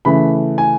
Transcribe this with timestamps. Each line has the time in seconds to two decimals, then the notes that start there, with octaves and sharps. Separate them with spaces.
0.05 C#3 E3 A3 B5
0.58 G#5